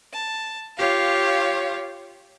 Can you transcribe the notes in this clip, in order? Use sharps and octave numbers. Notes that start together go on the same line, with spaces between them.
A5
F4 G4 C#5 F5